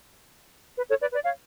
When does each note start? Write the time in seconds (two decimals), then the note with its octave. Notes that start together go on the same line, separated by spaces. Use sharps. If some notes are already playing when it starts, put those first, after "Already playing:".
0.77 B4
0.88 A4 C#5
0.99 B4 D5
1.12 B4 D5
1.23 C#5 F5